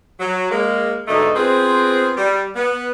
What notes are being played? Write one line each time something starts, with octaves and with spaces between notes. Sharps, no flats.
F#3
G#3 A#3
G#2 B2 D3 A3 D#4
B3 C4 F4 G#4 B4 C5
G3
B3